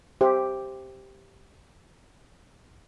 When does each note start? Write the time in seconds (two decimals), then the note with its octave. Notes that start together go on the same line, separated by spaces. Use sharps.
0.21 G4 C5 E5